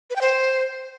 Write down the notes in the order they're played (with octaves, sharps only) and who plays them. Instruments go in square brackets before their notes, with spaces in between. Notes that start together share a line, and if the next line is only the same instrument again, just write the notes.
[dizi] B4
G5
C5